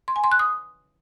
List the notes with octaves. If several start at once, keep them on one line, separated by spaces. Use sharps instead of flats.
C6
G#5
C6
F#6
D#6